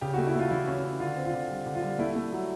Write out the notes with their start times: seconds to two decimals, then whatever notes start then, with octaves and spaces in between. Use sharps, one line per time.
0.01 C#3 G4
0.14 F#4
0.18 A3
0.27 E4
0.35 A3 F4
0.50 E3 E4
0.68 C#4
0.84 C#4
1.00 D3 F4
1.17 C4
1.25 F4
1.34 D3
1.50 G3
1.66 D3
1.75 F4
1.83 G3
1.99 A3 E4
2.16 A3
2.33 F#3